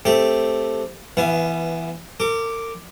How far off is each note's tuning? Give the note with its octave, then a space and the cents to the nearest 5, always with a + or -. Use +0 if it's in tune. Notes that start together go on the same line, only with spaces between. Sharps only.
A3 +0 C4 +0 G4 +5
E3 +10 B3 +0 F5 -40
A#4 -40 D6 +0